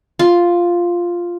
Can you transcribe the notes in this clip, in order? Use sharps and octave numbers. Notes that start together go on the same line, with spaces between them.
F4